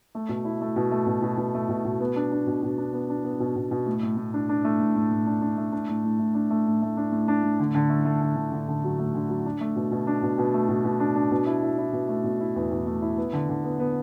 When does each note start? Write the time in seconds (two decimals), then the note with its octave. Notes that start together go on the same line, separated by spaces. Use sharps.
0.15 A3
0.29 B2
0.45 E4
0.61 A3
0.76 B2
0.91 A3
1.07 B2
1.22 B2
1.38 B2
1.54 A3
1.69 B2
1.85 B2
2.00 B3
2.16 D4
2.32 D4
2.47 B2
2.63 B2
2.78 D4
2.93 B3
3.10 D4
3.24 B3
3.40 B2
3.56 B2
3.71 B2
3.86 A2
4.03 A2
4.17 A2
4.34 D4
4.49 D4
4.64 A3
4.79 A2
4.96 A2
5.11 A2
5.27 D4
5.42 D4
5.58 A3
5.72 D4
5.89 A2
6.04 A2
6.19 A2
6.34 D4
6.50 A3
6.67 A2
6.82 A3
6.97 D4
7.12 A2
7.28 D4
7.43 A2
7.59 D3
7.75 D3
7.90 A3
8.05 A3
8.22 D3
8.36 D3
8.52 D3
8.68 D3
8.84 F#3
8.99 A3
9.15 D3
9.29 F#3
9.46 D4
9.61 A3
9.76 B2
9.91 B2
10.07 D4
10.23 B2
10.38 B2
10.54 A3
10.69 B2
10.84 B2
11.00 D4
11.16 D4
11.31 B2
11.47 E4
11.63 E4
11.78 E4
11.93 B2
12.09 A3
12.24 B2
12.40 E4
12.56 E2
12.71 E2
12.86 A3
13.02 E4
13.17 B3
13.33 D3
13.49 D3
13.64 B3
13.80 B3